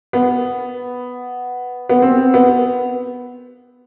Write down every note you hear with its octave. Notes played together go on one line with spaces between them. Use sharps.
B3
B3
C4
B3